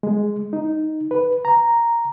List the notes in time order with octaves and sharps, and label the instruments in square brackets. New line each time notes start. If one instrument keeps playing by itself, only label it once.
[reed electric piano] G#3
D#4
B4
A#5